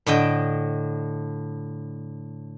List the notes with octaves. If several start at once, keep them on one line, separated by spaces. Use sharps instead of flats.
A2 D3 D#5 G5